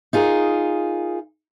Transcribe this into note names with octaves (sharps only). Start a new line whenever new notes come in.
D#4 F4 G#4 A#4